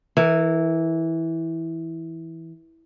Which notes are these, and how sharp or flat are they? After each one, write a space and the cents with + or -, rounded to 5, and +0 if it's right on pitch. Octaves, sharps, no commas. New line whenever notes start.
E3 -10 A#4 -35